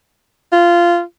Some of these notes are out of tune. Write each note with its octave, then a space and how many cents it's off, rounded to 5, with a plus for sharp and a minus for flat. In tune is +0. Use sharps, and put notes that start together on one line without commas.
F4 -15